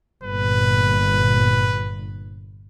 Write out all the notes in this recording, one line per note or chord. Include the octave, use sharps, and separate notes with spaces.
G1 A#2 B4